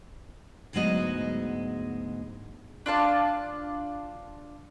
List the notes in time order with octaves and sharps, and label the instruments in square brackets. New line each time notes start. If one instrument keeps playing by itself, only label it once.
[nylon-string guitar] D2 G#2 F#3 G#3 B3 D#5
[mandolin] D4 F4 A5